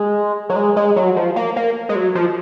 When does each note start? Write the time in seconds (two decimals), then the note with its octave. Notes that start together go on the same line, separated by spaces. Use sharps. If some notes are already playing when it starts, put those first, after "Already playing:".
Already playing: G#3
0.49 F#3
0.56 G#3
0.76 G#3
0.96 F#3
1.16 F3
1.36 A#3
1.56 A#3
1.89 G#3
1.95 F#3
2.15 F3